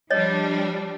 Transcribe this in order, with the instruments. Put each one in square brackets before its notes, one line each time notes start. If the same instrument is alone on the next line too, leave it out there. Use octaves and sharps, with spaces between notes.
[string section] F3 G3 D4 [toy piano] C#5 D#5